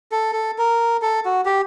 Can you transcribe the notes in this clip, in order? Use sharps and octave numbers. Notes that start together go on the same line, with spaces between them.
A4
A4
A#4
A4
F#4
G4